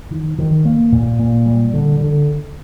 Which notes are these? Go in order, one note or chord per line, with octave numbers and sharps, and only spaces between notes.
D#3
D#3
A#3
A#2
A#2
G3
D3
D3